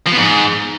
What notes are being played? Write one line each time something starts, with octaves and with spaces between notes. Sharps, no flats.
F3
B3
G#2